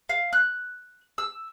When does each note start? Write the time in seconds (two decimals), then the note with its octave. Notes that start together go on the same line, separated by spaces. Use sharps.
0.09 F5
0.33 F#6
1.18 E6